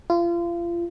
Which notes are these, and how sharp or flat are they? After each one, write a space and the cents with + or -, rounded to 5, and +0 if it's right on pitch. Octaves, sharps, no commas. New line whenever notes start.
F4 -30